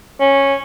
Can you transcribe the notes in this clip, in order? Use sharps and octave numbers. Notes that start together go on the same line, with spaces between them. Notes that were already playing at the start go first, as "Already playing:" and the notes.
C#4